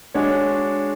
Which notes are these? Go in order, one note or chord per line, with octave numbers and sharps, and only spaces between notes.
G#3 D4 F#4 C#5